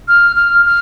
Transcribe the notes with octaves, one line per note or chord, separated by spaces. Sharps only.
F6
F6
F6